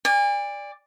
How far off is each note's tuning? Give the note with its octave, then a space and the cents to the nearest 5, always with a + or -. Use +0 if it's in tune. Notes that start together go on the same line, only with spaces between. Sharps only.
D5 +0 G#5 -40